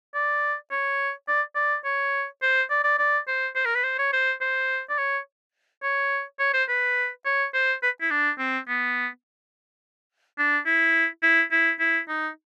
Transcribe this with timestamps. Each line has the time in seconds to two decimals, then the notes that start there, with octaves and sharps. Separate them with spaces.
0.15 D5
0.71 C#5
1.28 D5
1.55 D5
1.85 C#5
2.42 C5
2.70 D5
2.84 D5
2.99 D5
3.28 C5
3.55 C5
3.65 A#4
3.75 B4
3.84 C5
3.98 C#5
4.13 C5
4.41 C5
4.90 D5
4.98 C#5
5.83 C#5
6.39 C#5
6.54 C5
6.69 B4
7.26 C#5
7.54 C5
7.83 B4
8.01 E4
8.11 D4
8.39 C4
8.68 B3
10.39 D4
10.66 E4
11.23 E4
11.52 E4
11.80 E4
12.09 D#4